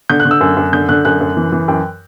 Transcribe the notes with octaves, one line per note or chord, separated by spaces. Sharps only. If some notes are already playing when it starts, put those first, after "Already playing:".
D3 G6
F#6
D3
E6
F#2
F#2
D3 G6
D3 F#6
F#2 F#6
F#2
E3
E3
F#2 G5